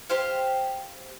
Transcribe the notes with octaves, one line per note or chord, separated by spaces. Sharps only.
G4 C5 F5